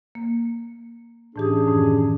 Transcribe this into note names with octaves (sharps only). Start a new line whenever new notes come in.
A#3
A2 E3 C#4 D4 G4 G#4
F#2 A2 D#3